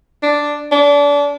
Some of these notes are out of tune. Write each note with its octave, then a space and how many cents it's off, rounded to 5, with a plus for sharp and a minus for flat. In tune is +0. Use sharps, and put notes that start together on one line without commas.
D4 +0
D4 -30